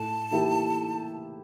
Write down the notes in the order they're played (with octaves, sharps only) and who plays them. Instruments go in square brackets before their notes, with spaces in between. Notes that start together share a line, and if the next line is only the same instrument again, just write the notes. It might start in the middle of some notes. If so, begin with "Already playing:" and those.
Already playing: [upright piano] A2 [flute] A5
[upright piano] E3 A#3 E4 G4